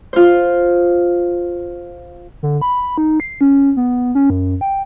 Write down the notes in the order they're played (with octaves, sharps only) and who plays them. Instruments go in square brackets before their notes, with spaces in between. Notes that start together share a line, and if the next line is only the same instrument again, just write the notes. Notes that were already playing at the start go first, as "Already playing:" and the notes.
[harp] F4 C5
[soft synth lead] D3
B5
D#4
C7
C#4
B3
C#4
F#2
G5